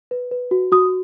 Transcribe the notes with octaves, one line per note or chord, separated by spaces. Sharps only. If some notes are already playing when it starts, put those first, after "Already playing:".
B4
B4
F#4
F#4 D#6